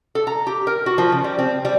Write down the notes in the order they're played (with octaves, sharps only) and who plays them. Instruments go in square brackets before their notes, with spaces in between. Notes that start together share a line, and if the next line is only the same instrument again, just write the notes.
[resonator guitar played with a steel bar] A4
A#5
G4
A#4
F#4
F3
C#3
G3
C4
G3